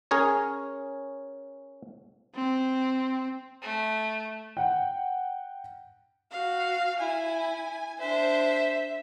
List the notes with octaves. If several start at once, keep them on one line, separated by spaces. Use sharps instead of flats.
C#4 G#4 A#4 C#5
C4
A3
F#5 G5
F#4 F5
E4 G#5
D4 C5 E5